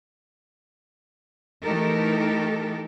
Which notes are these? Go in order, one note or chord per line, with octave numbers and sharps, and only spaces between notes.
E3 A3 D#4 G4 A4 A#4